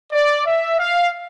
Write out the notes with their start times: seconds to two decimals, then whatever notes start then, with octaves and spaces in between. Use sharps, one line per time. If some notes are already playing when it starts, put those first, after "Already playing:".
0.11 D5
0.45 E5
0.78 F5